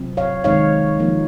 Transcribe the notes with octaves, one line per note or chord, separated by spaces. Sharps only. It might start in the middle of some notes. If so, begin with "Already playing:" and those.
Already playing: C3 F#3 C4 F4
C#5 F5
D#3 G#3 C4 D#4 C#5 F5
F3 A#3 D#4